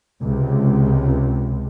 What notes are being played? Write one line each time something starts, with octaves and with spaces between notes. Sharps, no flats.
C#2 C3